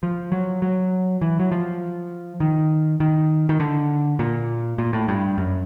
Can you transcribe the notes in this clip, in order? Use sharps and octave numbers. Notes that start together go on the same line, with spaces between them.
F3
F#3
F#3
E3
F#3
F3
D#3
D#3
D#3
D3
A#2
A#2
A2
G2
F#2